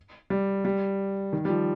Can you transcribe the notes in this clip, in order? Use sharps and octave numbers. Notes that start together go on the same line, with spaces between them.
G3
G3
D#3
G3
F3